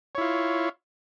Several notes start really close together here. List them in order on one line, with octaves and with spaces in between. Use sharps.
C#5 E4 F4